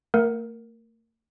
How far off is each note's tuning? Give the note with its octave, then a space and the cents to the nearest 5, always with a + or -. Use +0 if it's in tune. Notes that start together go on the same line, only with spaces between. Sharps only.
A3 +45 A#4 +5 F#5 +0